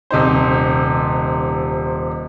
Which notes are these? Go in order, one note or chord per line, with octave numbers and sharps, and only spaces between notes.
D#1 C3 D#4 C5